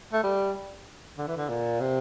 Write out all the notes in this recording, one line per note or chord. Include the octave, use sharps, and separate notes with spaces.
A3
G3
D3
E3
D3
A#2
C3